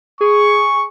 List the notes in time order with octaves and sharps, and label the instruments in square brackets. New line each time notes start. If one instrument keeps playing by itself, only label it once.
[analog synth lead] G#4 [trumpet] C#6